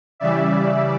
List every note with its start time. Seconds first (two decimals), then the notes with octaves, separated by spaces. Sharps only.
0.20 C#3 E3 G3 D5 E5